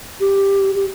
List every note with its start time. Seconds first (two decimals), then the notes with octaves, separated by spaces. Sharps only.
0.20 G4
0.75 G4